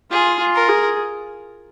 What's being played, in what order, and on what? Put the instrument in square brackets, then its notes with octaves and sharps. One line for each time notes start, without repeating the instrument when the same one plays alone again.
[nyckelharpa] F4 [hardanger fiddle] G#4
[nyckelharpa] F4
[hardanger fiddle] A#4
[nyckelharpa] G#4